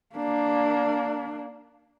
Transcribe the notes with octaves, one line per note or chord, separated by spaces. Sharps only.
A#3 D4